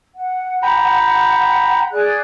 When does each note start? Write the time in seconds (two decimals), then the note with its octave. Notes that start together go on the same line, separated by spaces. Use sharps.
0.15 F#5
0.62 G5 A#5 B5
1.91 G#4 D5 F#6